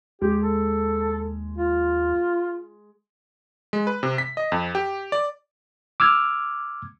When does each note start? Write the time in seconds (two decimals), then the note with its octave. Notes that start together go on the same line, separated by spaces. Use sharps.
0.22 D#2 G#3 G4
0.42 A4
1.58 F4
3.73 G#3
3.87 B4
4.03 C3
4.18 B6
4.37 D#5
4.52 F2
4.75 G4
5.12 D5
6.00 D6 E6 F6 G#6